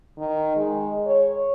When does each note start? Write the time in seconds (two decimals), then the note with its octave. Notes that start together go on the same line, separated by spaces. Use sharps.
0.18 D#3
0.56 G#3
1.07 C#5